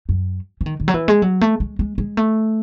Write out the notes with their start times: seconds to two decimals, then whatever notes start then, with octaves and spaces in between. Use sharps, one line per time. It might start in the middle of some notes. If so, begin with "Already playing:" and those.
0.09 F#2
0.61 E3
0.66 D#3
0.80 D#3
0.88 F#3
0.94 E3
1.08 G#3
1.22 F#3
1.41 A3
1.60 G#3
1.79 G#3
1.98 G#3
2.17 A3